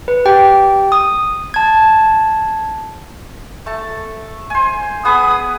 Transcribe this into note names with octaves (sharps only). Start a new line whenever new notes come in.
B4
G4 G5
D#6
A5 G#6
A3 A5
C5 G#5
B3 G#4 B4 D#6